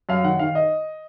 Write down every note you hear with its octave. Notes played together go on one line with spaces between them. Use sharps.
F#2 F5
D#3 F#5
D#3 F5
D#5